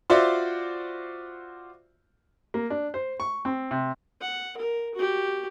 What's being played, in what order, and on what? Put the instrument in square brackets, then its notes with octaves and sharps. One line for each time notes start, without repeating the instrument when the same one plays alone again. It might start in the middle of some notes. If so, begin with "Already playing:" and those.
[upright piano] F4 F#4 C5 D5 E5
[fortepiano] A#3
D4
C5
C#6
C4
C3
[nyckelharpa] F#5
A#4
F#4 G4